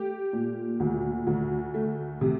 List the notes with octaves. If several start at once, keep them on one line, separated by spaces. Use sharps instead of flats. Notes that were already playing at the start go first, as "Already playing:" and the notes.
Already playing: A3 G4
A#2
D2
D2
A3
C3